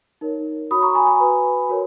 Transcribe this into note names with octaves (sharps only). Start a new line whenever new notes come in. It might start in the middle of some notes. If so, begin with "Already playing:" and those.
D#4 A#4 C#5
F#4 C#5 B5 D#6
A#5 C#6
G#5 B5
G#5 B5
F#4 B4
F#4 A#4 C#5